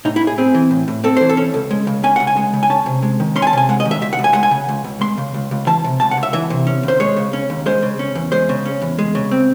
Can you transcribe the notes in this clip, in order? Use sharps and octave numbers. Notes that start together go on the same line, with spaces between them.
A2 D#4
E4
A2
G#4
C4 G#4
E3
A2
A2
C4 A4
E3 C5
A4
C#4
C#2
G#3
C#3
C#4 G#5
C#2 F#5
G#5
G#3
C#3
G#5
C#4 A5
C3
G#3
D#3
C#4 C6
G#5
A5
C3 G#5
G#3 F#5
D#5
D#3
E5
C#2 E5
F#5
C#2
G#5
G#3 F#5
G#5
C#3
C#2
C#2
G#3 C6
C#3
C#2
C#2
E3 A5
C3
C#2 A5
F#5
C#2
E5
E3 E5
C3
C#4
D#2 C5
G#3 C#5
C#3
C#4
D#2
G#3 C5
C#3
C#4
E2
G#3 C5
C#3
C#4
E2
G#3
C#3
C4